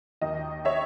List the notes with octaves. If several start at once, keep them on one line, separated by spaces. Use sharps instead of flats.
D#2 D#3 D#5
C#5 E5